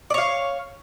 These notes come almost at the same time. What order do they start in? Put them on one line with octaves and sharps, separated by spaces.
D5 C#5 F5